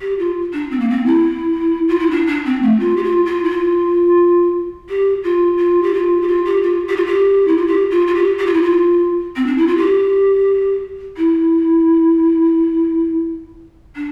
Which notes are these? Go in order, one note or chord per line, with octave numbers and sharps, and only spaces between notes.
G4
F4
D4
C4
A#3
C4
E4
F4
E4
D4
D4
C4
A3
F4
G4
F4
F4
E4
F4
G4
F4
F4
G4
F4
G4
F4
G4
F4
G4
F4
G4
E4
F4
G4
F4
F4
G4
G4
F4
E4
F4
C4
D4
E4
F4
G4
E4
D4